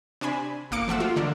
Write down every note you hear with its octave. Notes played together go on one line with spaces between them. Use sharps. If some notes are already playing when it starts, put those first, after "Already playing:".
C3 D4 G#5 B5
G1 A#3 D6 C#7 D7
F3 A3 F#5 E6
F4
D3 D4 A#4